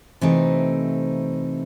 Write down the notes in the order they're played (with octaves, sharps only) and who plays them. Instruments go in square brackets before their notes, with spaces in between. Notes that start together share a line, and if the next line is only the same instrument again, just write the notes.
[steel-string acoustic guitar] C3 E3 A3 C4 D#4